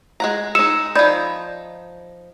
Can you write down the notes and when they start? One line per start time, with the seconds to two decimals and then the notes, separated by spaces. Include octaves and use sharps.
0.20 G#3 F#5 A#5
0.55 G#3 D#4 E6 C#7 E7
0.96 F3 D#4 D5 B5 G6